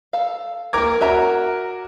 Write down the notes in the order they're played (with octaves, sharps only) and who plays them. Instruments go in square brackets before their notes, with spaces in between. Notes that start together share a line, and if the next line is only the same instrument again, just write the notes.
[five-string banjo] A4 F5
[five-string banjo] A#3 E4 G4 [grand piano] A#4 D6 G#6
[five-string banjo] C#4 E5 A#5 [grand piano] F#4 A#4